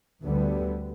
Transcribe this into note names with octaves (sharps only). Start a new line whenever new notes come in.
D2 D3 G3 B3